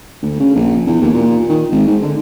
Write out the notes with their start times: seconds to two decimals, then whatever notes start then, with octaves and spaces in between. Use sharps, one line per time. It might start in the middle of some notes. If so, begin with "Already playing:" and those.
0.23 D2
0.40 C#3
0.55 A#1
0.87 E2
1.01 D#2
1.14 A#2
1.49 D#3
1.72 G#1
1.87 G#2
2.02 D3